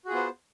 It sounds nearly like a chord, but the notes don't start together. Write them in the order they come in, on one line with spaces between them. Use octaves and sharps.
F#4 G#4 F4 B3 C5